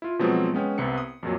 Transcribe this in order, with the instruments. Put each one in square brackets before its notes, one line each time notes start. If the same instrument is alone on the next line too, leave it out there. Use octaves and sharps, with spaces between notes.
[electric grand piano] E4 F4
B2 F3 F#3 G#3 B3 C4
G#3 B3 C#4 G5
C2 C3 B3 C#7
D#6
F2 A#2 F#3